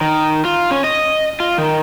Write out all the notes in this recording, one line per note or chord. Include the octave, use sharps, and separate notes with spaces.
D#3
F4
C#4
D#5
F4
D#3